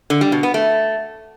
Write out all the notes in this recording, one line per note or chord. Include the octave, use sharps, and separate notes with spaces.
D3
G3
B2
B3
A3